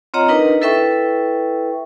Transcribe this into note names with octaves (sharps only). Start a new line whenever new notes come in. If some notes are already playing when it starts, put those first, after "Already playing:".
C4 F4 C#5 D#5 F#5 A#5
D4 D#4 A#4 B4 D#5
E4 A4 B4 E5 G5 C#6